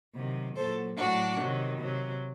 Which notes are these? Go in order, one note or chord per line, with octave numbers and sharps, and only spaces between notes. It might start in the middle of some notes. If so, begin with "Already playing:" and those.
C3 D#3 F#3
A#2 F#3 A4 C5
A2 F#3 D4 F#4
C3 D#3 F#3
C3 F#3